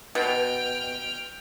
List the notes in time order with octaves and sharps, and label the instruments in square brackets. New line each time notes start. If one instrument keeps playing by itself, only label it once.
[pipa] B2 [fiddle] G5 F6